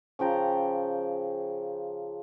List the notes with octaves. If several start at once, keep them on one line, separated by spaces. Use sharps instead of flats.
C#3 F3 G5 A#5